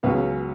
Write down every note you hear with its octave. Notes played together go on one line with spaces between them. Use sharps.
C#2 C#3 F#3 B3 C#4 B4